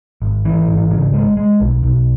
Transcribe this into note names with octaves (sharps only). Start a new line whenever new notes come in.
G#1
E3
G#1
C#3
G#3
G#3
B1
B1